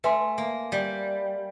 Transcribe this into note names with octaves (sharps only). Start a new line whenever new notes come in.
A3 B4 E5 G#5 C6
A#3
G3